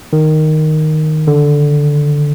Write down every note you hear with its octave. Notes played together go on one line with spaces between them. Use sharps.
D#3
D3